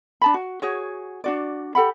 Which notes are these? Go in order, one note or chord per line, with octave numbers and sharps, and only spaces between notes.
D4 A5 B5
F#4
F#4 G#4 C#5
D4 F#4 D5
G4 A4 F#5 B5